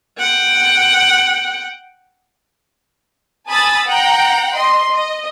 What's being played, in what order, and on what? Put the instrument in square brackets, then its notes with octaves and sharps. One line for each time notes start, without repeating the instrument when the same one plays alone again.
[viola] F#5 G5
[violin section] G#5 A5 B5 D#6 E6 A6
F#5 G5 A#5
D#5 C6
D#5